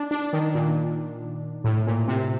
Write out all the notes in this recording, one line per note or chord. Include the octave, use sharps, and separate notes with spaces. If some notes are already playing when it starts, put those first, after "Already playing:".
Already playing: D4
D4
D#3
A#2
A2
A#2
C3